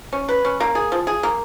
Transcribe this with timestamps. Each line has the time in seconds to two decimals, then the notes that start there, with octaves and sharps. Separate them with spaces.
0.13 C#4
0.29 B4
0.45 C#4
0.60 A#3
0.75 G#4
0.92 F3
1.07 G#4
1.23 A#3